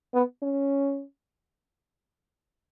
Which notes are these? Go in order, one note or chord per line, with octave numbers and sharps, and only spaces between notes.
B3
C#4